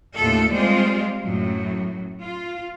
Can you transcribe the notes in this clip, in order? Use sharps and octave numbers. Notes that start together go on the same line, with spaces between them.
D#2 A2 C#3 A3 F4 A4
G3 G#3 C4 F4 C5 D5
F#2 A2 F#3
F4